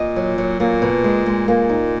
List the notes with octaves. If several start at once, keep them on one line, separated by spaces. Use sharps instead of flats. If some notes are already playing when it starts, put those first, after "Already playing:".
Already playing: A#2 D#5
F#3
F#3
A#2 A#3
B2
G#3
G#3
A#2 A#3
D#4